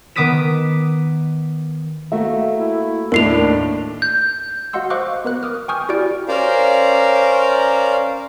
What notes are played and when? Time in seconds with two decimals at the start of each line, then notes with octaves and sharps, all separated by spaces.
0.16 D#3 B3 D6 D#6 B6 E7
2.12 A3 A#3 F#4 E5
2.58 E4
3.12 D#2 A2 D4 D#4 A#4 C7 F7
4.02 G6
4.73 F#4 D#5 F5 F#5 C6 E6
4.90 C5 D#5 F5 C#6 D6 F#6
5.25 B3 A#4 B4 F#6
5.43 D6 D#6 F6
5.68 G5 G#5 C#6 D#6 F6 G6
5.89 E4 F#4 G4 D5 F6 D7
6.28 C#4 A#4 C5 D5 F5 A#5